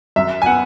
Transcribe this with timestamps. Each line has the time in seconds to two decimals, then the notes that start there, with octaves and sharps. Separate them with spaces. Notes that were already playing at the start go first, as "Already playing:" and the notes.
0.16 F#2 E5
0.42 G#5
0.46 B3 F#5